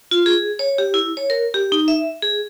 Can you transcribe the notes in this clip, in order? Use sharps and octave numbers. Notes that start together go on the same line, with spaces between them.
F4
G#4
C#5
G4
E4
C#5
A#4
G4
D#4
E5
G#4